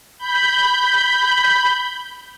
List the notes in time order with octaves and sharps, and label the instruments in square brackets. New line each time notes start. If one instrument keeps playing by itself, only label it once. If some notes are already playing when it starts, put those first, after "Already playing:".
[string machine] B5 G6